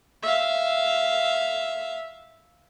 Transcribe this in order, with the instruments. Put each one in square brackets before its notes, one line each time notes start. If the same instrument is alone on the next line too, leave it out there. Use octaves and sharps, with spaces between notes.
[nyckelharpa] E5 F5